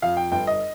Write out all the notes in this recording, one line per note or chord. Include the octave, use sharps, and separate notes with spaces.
F2 F5
G5
G1 G5
D#5